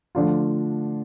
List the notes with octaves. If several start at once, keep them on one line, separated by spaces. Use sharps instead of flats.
D3 F3 A3 D4 F4